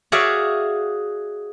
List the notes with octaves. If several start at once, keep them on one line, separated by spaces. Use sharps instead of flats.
F#4 G#4 C#5 D5 E5 F5